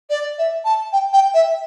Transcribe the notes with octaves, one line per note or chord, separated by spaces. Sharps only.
D5
E5
A5
G5
G5
E5